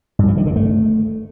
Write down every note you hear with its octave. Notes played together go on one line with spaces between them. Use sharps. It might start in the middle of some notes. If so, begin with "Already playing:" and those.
G2
F3
D#3
D3
A3